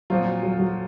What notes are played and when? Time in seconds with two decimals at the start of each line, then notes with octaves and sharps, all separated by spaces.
0.10 A#2 F3 F#3 C4 F4
0.43 F#3
0.59 F#3